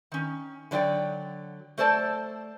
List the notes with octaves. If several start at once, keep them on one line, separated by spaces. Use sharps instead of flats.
D#3 C#4
D3 F#3 D5 F#5 G5
A3 A4 C5 D5 A5